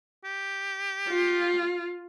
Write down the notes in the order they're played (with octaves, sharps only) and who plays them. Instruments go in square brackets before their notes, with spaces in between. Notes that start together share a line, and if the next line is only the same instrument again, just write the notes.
[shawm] G4
[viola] F4